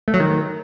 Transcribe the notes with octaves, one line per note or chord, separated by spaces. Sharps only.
A3
F#3
D#3